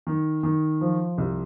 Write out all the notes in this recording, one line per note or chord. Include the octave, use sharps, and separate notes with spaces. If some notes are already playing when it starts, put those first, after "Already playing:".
D#3
D#3
F3
C2